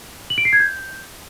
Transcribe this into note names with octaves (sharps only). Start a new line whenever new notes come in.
F#7
D7
C7
G#6
G6